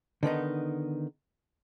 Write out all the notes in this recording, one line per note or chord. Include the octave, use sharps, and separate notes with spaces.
D3 D#3 B3 D#4